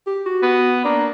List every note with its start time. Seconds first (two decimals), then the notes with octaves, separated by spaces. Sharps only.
0.07 G4
0.26 F#4
0.43 B3
0.85 A#3 D4